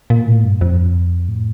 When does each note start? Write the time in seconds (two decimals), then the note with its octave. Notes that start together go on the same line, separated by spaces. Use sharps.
0.10 A#2
0.27 A2
0.44 G2
0.61 F2
1.29 A2